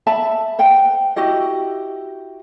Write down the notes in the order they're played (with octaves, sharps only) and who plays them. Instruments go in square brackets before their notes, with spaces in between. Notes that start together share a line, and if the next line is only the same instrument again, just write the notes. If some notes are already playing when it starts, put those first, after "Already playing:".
[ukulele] E5 A5 B5
C5 F#5 G5
E4 F#4 G4 D#5